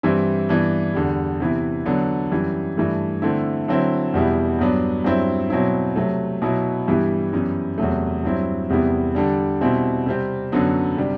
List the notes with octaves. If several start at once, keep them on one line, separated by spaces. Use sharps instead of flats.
G2 E3 G3 C4 E4
G2 E3 B3 D4
E2 D3 G3
C3 E3 B3 E4
D3 F#3 B3 D4
F#2 E3 G3
G2 E3 A3
D3 A3 C4 E4
D3 F#3 C4 E4
E2 B2 G3 B3 E4
G2 F#3 B3 D4
G2 F#3 C4 E4
B2 F#3 C4 E4
C3 F#3 A3
B2 F#3 B3 E4
G2 E3 G3 B3 E4
F#2 E3 G3 B3
E2 C3 F#3 A3
G2 F#3 C4 E4
E2 C3 G3 B3 E4
D3 G3 D4
B2 G3 C4 E4
C3 G3 C4
F#2 D3 F#3 B3
C3 G3 D4